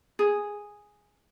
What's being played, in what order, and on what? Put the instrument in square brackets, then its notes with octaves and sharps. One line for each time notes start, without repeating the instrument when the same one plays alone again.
[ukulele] G#4